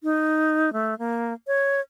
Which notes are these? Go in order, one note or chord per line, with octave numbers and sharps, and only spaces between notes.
D#4
A3
A#3
C#5